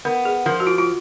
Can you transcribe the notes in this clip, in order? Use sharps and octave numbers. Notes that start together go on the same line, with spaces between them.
B3 A#4
G#4
F3 A#4
F#4
F4
F4